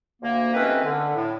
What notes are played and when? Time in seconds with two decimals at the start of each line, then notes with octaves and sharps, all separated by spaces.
0.22 D2 A#3
0.54 C2 D#3 A3 C4 C#4 B4
0.84 D3
1.15 A2